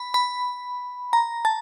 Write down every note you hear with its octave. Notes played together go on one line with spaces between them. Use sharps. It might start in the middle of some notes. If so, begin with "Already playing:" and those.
Already playing: B5
B5
A#5
A5